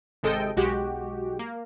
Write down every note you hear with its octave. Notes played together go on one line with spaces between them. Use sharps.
G#1 C3 G#3 A4 D#5 G5
B1 G#3 F#4 G4
A#3